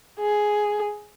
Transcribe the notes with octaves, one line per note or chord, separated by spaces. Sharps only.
G#4